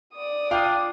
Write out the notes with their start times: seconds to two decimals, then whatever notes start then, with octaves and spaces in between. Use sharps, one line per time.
0.14 D5 D#6
0.51 D4 F4 F5 G5